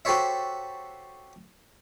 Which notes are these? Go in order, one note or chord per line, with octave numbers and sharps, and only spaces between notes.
F#4 G4 A4 C5 C#5 E5